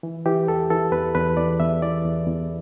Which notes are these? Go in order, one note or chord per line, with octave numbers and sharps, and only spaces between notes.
E3
E3 G4
E2 A4
E3 A4
E2 B4
E2 B4
E2 D5
E2 E5
E3 D5
E2
E2